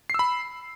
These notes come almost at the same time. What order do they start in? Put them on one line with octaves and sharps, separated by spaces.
C7 E6 B5